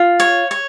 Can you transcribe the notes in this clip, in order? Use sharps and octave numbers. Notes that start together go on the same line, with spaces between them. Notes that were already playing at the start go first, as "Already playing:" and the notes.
Already playing: F4
C#5
C#5